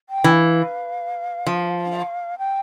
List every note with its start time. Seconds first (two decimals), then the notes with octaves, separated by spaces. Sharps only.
0.09 G5
0.24 E3
0.32 F5
1.47 F3
2.38 G5